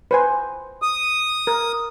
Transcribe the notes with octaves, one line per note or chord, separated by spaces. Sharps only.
B4 C5 G#5
D#6
A#4